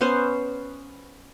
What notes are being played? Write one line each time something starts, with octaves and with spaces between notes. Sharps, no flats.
B3 C#4 C5